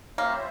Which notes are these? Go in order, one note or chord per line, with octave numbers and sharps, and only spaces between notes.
G3 A#3 C#4 F4 C5 E5